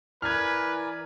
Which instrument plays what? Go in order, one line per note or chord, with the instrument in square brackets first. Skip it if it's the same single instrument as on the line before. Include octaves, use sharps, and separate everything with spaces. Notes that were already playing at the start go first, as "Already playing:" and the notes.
[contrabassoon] E3 [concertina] A#4 D5 G#5 [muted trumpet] B4 [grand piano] F6 G#6